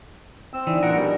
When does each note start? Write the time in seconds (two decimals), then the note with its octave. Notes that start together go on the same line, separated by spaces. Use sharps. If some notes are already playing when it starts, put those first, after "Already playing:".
0.53 C4 E6
0.67 E3 D4 D#4 D5
0.83 A#2 A#4 F#5
0.95 B2 G3